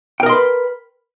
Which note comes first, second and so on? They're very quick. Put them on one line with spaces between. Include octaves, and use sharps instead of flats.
G5 A#4 D#5 C6 B4